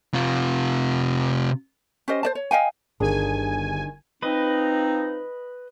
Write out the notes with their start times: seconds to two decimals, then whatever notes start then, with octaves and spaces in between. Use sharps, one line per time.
0.14 C3 F4
2.08 C#4 G4 C5 D#5
2.23 C5 D5 A5
2.35 C#5
2.51 D#5 F5 G5 G#5
3.00 G1 D#3 D4 G#4 G#5
4.23 F3 C4 D#4 B4 D#5